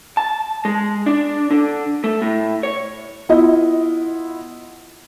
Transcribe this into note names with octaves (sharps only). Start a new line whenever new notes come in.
A5
G#3
D4
D3
A3
A2
C#5
B3 E4 F4 D#5